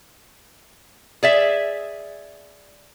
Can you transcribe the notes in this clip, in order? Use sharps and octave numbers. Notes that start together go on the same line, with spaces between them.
G#4 D5 E5